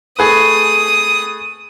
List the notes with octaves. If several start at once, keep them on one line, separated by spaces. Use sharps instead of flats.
A3 G#4 B4 D#6